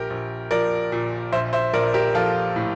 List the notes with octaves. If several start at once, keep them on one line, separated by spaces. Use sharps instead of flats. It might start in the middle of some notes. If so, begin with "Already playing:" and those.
Already playing: A#1 G4 A#4
A#1
F3 A#4 D5
A#2
A#1 C5 E5
C5 E5
A#1 A#4 D5
G4 A#4
F3 F4 A4
A2